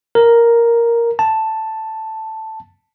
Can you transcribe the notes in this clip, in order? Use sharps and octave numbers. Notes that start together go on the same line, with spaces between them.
A#4
A5